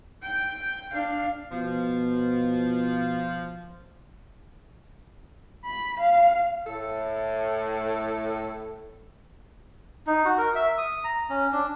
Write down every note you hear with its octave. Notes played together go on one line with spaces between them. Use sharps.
G5
D4 F5
B2 F3
B5
F5
A2 A4
D#4
F#4
A#4
E5
D#6
A#5
C#4
D4